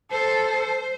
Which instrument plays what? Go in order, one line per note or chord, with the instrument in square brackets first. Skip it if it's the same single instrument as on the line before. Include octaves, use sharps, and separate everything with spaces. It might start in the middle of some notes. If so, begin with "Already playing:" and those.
[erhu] A4 [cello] C5